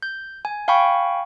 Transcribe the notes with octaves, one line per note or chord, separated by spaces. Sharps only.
G6
G#5
F5 G5 G#5 B5 C#6